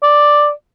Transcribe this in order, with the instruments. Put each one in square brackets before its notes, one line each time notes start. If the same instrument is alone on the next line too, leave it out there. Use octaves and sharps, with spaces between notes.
[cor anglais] D5